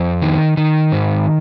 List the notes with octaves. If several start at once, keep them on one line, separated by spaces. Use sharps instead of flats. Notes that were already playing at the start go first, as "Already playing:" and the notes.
Already playing: F2 C4
D#3
D#3
G#2